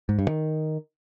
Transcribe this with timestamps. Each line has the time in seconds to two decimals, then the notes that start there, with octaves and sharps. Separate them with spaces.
0.09 G#2
0.19 G2
0.28 D#3